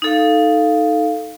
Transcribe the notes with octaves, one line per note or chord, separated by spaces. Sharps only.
D#4 A4 F5